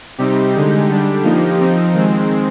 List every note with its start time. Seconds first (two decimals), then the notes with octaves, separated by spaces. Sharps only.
0.18 C3 G3 C4 D#4 G4
0.53 D3 G#3 D#4
0.89 D3 G3 D4
1.23 F3 A#3 D#4
1.59 F3 C4 D#4
1.94 D#3 G#3 C4